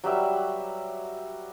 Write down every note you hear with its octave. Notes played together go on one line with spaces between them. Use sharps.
F#3 G3 B4 E5